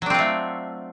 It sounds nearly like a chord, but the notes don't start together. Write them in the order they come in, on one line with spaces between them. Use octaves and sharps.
F#3 D4 C4 F4 A3